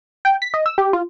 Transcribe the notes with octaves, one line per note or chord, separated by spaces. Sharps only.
G5
B6
D#5
E6
G4
F4